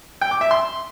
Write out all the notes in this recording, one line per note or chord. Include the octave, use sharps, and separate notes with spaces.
G5
D6
E5
C6